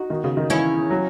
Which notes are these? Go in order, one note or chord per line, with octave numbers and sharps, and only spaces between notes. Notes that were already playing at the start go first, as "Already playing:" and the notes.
Already playing: D#4 F#4
D#3
C#3
D#3
E3 C#4 E4
F#3